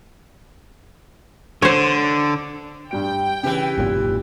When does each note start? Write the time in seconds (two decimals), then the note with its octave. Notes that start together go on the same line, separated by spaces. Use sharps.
1.62 D3 C5 C#5
2.91 G2 G3 G5 D7
3.43 C#3 E3 G4 B4
3.78 G#1 F#2 A#2